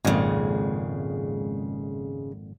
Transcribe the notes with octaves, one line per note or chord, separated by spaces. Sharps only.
G#1 F2 A#2 C#3 G#3